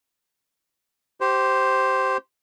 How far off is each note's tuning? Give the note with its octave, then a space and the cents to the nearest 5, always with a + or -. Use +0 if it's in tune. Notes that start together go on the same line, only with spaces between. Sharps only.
G4 -20 C5 +0